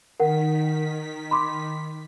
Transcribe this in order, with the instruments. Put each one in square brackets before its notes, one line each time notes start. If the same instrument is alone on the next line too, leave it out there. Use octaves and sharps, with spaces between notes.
[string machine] D#3 B6 [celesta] A#4 F#5
[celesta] B5 C6 D6